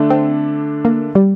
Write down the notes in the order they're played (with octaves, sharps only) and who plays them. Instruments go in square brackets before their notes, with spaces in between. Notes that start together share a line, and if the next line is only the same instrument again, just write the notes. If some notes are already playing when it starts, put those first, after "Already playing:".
Already playing: [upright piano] D3 A3 D4 A4
[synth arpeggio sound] C4
A#3
G3